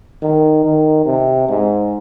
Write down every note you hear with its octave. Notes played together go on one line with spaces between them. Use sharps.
D#3
D#3
C3
G#2